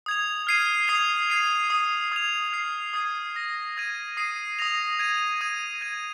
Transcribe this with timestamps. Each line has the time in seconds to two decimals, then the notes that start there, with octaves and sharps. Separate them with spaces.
0.06 D#6 G#6 F7
0.47 F6 G#6 C7 D#7
0.88 D#6 G#6 C7 F7
1.30 G#6 C7 D#7
1.70 D#6 C7 D#7
2.12 D#6 G#6 F7
2.53 F6 C7 F7
2.94 D#6 G#6 C7 D#7
3.35 D#6 A#6 D#7
3.77 D#6 G#6 D#7
4.17 D#6 C7 D#7
4.59 D#6 A#6 F7
4.99 G#6 D#7
5.41 D#6 G#6 D#7
5.81 G#6 D#7